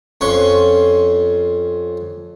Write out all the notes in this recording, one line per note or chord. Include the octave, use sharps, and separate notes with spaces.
F2 C#4 C6 C#6